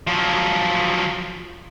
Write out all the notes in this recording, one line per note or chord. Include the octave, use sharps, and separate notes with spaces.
F3 F#3